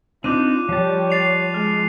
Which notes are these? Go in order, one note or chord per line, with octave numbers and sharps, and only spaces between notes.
C4 D4 D#4 F4 D6 F#6 D#7
F3 G3 C#5 A5
A6 C7 F7
G#3 F6